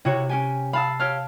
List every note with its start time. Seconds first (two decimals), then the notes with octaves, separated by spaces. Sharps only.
0.05 C3 E4 F#4 C#5
0.29 C#4 G4 G#5
0.73 F5 A5 B5 E6
1.00 G4 C#5 F5 F6